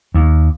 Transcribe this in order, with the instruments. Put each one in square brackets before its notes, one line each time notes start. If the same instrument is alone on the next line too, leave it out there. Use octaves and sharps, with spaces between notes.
[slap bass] D#2